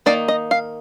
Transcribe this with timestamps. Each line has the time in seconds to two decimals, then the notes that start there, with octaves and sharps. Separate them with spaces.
0.06 D#3 A#3 D#4 D5
0.28 D#5
0.51 F5